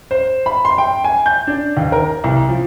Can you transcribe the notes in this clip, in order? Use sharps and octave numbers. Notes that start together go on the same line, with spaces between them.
C5
B5
C6
G5
G#5
G6
D4
D#2
A#4
C2
F3